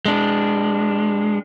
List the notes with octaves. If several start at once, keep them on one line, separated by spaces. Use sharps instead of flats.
G#3 D4